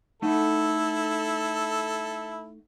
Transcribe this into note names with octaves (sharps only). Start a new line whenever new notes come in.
A3 D#4 E4 A4 F#5